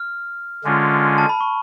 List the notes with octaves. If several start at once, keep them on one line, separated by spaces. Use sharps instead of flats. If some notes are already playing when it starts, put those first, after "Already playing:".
Already playing: F6
D3 G#3 C#4 F4
A5
B5
C#6